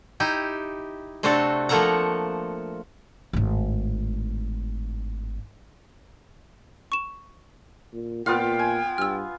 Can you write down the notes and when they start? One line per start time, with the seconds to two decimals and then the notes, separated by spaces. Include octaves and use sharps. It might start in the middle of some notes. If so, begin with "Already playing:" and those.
0.20 D#4 E4 G4
1.23 C3 A3 C4 D4 F#4 A4
1.69 F3 A3 A#3 A4 F#5 A#5
3.33 G#1 A2
6.92 C#6 E7
7.93 A#2
8.26 A#2 B3 F4 F5 G5 F6
8.59 G#5
8.98 G2 E6 F6